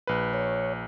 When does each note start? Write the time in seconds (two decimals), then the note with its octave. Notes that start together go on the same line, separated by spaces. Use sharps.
0.07 A#1 B4
0.34 C#5